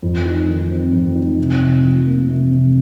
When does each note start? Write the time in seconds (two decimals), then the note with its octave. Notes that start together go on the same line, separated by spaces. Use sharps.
0.02 F2
0.25 D#4
0.49 D#3
0.71 C4
0.93 F2
1.15 D#4
1.39 C3
1.61 C3
1.84 F3
2.06 A#3
2.28 C3
2.52 C3